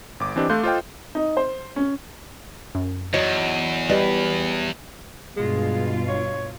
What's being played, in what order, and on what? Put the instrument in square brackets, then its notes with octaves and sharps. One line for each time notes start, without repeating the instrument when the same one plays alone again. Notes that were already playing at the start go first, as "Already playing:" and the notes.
[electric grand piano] G1 D6
E3 C4 D4 G4 D#5
A3 A4 F5 C6 F#6 G6
F4 A4 C5 D#5 F5 G5
[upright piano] D#4
C5
C#4
[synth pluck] F#2
[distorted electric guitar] E2 [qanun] F#3 C#6 [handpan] D#5
[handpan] G3 G4 [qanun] B4 [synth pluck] D5 D#5
[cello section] G2 B2 F4 [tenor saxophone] G#3
[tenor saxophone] C#5